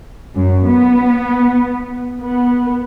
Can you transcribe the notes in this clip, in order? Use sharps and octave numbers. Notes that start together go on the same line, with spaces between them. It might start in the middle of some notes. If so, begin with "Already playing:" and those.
F#2
B3
B3